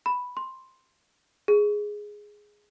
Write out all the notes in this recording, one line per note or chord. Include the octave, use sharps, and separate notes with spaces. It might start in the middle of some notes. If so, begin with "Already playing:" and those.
B5
C6
G#4